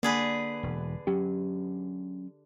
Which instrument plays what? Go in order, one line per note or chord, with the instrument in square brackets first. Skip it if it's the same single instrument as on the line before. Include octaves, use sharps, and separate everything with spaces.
[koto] D3 G#4 B4 [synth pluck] A#3
[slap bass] E1
[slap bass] F#3 C#4 [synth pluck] G4